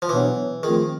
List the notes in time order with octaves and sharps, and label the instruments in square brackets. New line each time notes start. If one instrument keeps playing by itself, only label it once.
[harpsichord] F3
[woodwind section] B2 F#3 B3 D4 [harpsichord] E3
[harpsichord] D#3 [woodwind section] F3 A3 C4 F4 G#4